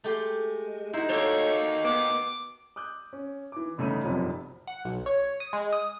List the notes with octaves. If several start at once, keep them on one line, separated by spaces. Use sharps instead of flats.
G#3 A3 G4 C6
D#4 E4 F#4 C5
D#3 A#3 A4 C#5
B3 D6
D6 D#6 F#6 G6
C#4
E3 D6
G1 C#3 A3 D#4 B5 D#7
F1 B1 F#2 C3 F3 B5
F#5
B1
C#5
D#6
G#3
D#6